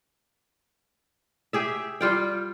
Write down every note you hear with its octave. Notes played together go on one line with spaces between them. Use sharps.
G4 G#4 E5
G3 F4 G5